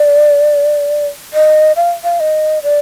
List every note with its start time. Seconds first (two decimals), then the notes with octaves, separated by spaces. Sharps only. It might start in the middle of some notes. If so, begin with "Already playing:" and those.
Already playing: D5
1.33 D#5
1.76 F5
2.04 F5
2.20 D#5
2.63 D5